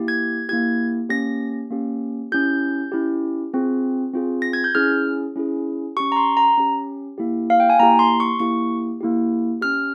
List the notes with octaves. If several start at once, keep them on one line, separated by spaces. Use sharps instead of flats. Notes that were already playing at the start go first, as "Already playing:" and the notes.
Already playing: A#3 E4 G4
G#6
A#3 E4 G4 G#6
A#3 C#4 G4 A#6
A#3 C#4 G4
C#4 E4 G4 G6
C#4 E4 G4
C4 F4 G#4
C4 F4 G#4
A#6
G#6
G6
C#4 E4 G#4 F6
C#4 E4 G#4
C#4 G4 C#6
A#5
C6
A#5
C#4 G4
A#3 E4 G4
F5
G5
G#5
A#3 E4 G4 A#5
C6
C#6
A#3 E4 G4 C#6
A#3 E4 G4
C#4 G4 F6